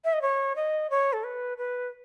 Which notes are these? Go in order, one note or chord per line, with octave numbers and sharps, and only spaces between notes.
E5
D#5
C#5
D#5
C#5
A4
B4
B4